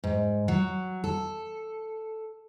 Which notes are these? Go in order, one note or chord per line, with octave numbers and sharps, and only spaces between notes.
G#2
F#3
A4